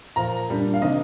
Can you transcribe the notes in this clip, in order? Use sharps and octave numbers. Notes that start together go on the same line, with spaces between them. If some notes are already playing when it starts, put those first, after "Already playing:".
A#2 F3 A#3 A#5
A#2 G3 A#3 D4
F5
C3 D#3 A#3 D4 D#5